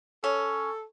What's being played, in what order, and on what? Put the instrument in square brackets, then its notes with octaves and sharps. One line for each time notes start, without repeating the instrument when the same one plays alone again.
[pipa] C#4 [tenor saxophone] A4